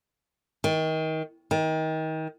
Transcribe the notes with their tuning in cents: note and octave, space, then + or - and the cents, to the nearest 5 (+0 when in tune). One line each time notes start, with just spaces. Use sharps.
D#3 +30
D#3 +30